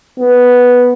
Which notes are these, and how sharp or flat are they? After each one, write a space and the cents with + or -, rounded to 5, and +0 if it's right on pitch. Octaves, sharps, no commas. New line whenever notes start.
B3 -5